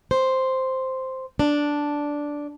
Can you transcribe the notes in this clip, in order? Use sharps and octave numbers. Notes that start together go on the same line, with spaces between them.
C5
D4